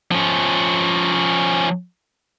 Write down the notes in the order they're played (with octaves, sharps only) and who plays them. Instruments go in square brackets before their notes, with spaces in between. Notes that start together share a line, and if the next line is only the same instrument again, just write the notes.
[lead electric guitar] F3 C#4